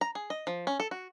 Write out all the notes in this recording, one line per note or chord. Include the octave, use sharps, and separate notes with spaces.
A#5
G#4
D#5
F3
C#4
A4
F#4